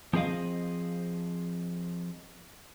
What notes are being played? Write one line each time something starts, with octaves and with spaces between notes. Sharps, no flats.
F3 C4 G#4 D#5 F5